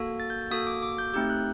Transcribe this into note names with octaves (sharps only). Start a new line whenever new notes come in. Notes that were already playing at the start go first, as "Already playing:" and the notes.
Already playing: A#3 F#4 A4
A6
G6
A#3 F#4 A4 D#6
D6
D6
G6
A3 C4 D#4 G4 G6
F#6